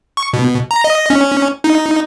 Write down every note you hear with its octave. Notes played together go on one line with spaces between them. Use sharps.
C#6
B2
A#5
D#5
C#4
D#4